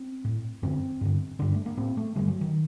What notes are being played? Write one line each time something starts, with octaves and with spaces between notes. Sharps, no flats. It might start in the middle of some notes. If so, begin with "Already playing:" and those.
Already playing: C4
A2
F#2 D3 C4
G2 D3
G2 D3 D4
A3
A#3
A2 C4
A3
G2 D3 G3
F#3
D#3